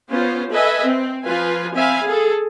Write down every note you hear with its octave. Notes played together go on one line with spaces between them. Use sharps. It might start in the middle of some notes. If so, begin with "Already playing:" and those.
B3 C#4 F4 C5
A4 B4 D#5 E5 G#5
C4
F3 F4 B4 G#5
C4 E5 F5 G#5 B5
G#4 A4